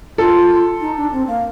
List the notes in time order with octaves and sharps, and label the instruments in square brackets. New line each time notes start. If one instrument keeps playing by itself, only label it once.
[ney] F4 [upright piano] A4
[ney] D#4
D4
C4
A#3